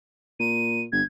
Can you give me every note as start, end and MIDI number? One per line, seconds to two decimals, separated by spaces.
0.40 0.85 46
0.40 0.82 99
0.92 1.02 31
0.92 1.03 92